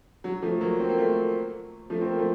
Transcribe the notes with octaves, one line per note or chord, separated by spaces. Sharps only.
F#3
F3 A3
F#3 A#3
C4
A#3
A3 C4
F3 A3
C4
A#3
F3 A3